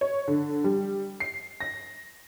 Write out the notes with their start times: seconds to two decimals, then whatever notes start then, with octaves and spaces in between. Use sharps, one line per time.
0.01 C#5
0.28 D3
0.64 G3
1.20 C7
1.60 A#6